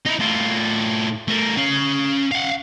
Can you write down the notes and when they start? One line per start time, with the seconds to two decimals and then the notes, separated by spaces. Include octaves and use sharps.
0.06 D#4 E4
0.20 A2 F4
1.28 A3 A#4
1.57 C#4 F5
2.32 F5 F#5